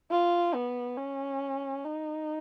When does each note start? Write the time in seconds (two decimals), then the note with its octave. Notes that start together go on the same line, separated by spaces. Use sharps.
0.11 F4
0.54 B3
0.97 C#4
1.85 D#4